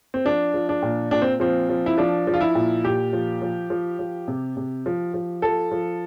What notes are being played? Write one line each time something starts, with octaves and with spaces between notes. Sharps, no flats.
C4
F3 D4
F3
D4
A#2
A#2 D4
C4
F3 C4
F3
E4
F3 D4
F3
F4
E4
A#2
A#2 G4
F3
F3
F3
F3
C3
C3
F3
F3
F3 A4
F3